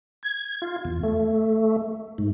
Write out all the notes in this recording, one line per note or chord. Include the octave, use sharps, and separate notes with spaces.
G#6
F4
E2
A3
G#2